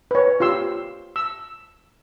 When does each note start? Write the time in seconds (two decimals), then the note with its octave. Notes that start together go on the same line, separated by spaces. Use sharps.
0.11 B4 C#5
0.40 F4 G4 C6 E6
1.16 E6